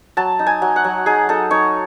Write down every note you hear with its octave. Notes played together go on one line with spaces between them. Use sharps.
F#3 A5
D#4
G#5
F#3
F#5
F#3
D#4 G#4
D#4 A4
D#4 C#5